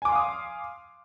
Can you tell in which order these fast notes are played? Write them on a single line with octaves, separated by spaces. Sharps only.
G#5 D6 C6 F5 D#6